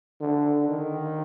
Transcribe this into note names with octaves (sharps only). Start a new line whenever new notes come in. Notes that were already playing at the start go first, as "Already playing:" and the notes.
D3
D#3